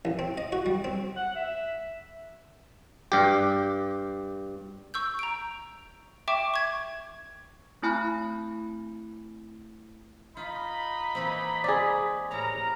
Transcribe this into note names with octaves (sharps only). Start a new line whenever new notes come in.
A1
C4
D#5
F#4
G3
C4
F#5
E5
G2 G4
C#6 E6 G6
A#5 D7
E5 G5 C#6 D6 E7
C#6 G#6
A3 C4 E4 G#5 B5 F#6
D#4 F4 B5
E3 A#3 C4
G#3 C4 G#4 D5
A2 G3 A#4 A#5